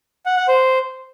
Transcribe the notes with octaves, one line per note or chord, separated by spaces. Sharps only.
F#5
F#5
C5